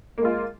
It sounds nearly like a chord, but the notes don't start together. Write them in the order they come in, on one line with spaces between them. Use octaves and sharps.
A#3 G#3 F4